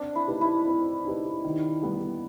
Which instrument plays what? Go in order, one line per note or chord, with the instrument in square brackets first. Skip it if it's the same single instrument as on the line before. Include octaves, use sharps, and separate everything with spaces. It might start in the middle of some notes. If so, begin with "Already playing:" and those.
Already playing: [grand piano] C4 [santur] D4
[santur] E4
[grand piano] D#4 G4 B4
[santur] E4
[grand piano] C4
D#4 G4 B4
D#3
G3 B3 D#4